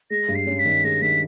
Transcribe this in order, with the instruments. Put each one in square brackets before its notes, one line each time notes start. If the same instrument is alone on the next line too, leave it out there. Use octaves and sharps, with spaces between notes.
[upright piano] G#3 [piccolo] A#6
[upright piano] G2
[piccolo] C7
[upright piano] C#4
[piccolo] B6
[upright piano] D#3
[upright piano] G#3 [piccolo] A#6
[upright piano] D#3 [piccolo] B6